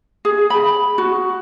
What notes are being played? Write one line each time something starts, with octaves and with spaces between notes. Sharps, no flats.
G#4
B5
F#4